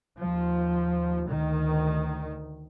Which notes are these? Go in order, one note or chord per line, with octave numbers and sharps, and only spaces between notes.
D#2 F3
D2 D#3